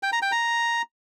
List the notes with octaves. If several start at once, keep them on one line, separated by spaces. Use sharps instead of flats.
G5
A#5
G5
A#5